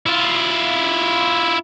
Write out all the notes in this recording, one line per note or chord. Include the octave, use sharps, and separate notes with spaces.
E4 F4